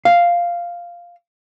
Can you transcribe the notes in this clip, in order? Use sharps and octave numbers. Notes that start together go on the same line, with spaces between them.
F5